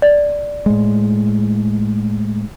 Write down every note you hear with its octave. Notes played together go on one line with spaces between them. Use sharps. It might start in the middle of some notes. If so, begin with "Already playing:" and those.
D5
A2 G#3